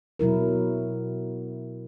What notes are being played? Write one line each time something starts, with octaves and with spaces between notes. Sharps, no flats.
B2 F#3 E4 A#4